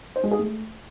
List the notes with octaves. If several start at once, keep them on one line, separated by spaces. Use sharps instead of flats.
C5
G#3
G#4
A3